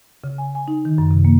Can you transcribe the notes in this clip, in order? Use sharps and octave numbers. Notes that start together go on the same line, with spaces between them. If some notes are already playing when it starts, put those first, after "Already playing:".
C#3
G#5
G#5
D#4
D#3
F#2
C3
A#3